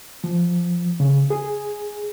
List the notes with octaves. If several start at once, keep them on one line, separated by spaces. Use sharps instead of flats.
F3
C#3
G#4